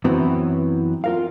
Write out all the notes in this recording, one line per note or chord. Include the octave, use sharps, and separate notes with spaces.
F#2 E3 F#3 B3 C4 E4
F4 A#4 F5